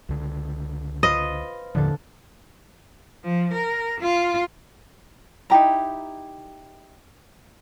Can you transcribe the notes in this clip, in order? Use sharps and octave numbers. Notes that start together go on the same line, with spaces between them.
C#2 D3
F4 B4 C5 D#5
D#2 A2 D3 F3 A4
F3
A#4
F4
D#4 E4 G4 A#5